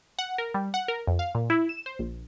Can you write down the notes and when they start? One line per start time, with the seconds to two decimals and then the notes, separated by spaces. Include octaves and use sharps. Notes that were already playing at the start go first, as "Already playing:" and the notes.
0.19 F#5
0.38 A#4
0.54 G3
0.74 F#5
0.88 A#4
1.07 F2
1.19 F5
1.35 A#2
1.50 E4
1.69 E7
1.86 C5
1.99 A#1